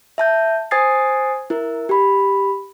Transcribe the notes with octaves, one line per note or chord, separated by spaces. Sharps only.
E5 A5 G6
C5 G#5 D#6 G#6 A6 C7
E4 A#4
G4 B5